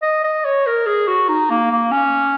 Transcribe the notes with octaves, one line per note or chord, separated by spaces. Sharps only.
D#5
D#5
C#5
A#4
G#4
F#4
D#4
A#3
A#3
C#4